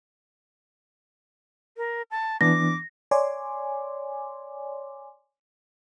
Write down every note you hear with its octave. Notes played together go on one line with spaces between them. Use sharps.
A#4
A5
E3 B3 D4 D6 A#6
C#5 D5 G#5 C6 D6